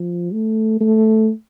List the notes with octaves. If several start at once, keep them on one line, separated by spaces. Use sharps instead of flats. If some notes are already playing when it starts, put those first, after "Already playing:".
Already playing: F3
A3
A3